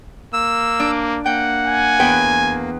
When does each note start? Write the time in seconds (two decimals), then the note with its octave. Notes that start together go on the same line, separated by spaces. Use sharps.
0.33 A#3 E6
0.80 D4 D6
1.26 A#3 F#5 G5
1.67 G#5
2.00 E2 B4 G5